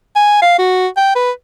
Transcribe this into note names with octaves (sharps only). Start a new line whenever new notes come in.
G#5
F5
F#4
G5
B4